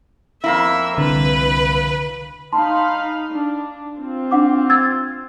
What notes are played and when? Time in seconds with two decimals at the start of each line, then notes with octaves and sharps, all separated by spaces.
0.44 F2 A#3 E4 E5
0.98 C2 D3 B4
2.53 D#4 F5 A5 B5 C6
3.32 D4
3.94 C4 F4
4.31 D4 F#5 D6
4.70 E6 G#6 A6